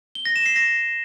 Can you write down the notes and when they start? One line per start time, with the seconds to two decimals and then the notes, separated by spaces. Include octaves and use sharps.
0.15 G7
0.25 A#6
0.36 E7
0.46 C7
0.56 A#6